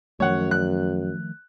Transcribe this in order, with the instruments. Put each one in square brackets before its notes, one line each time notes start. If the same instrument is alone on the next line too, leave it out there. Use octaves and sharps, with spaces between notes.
[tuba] F#2 [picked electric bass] D#3 F3 A3 [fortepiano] C#5 F#5
[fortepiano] F#6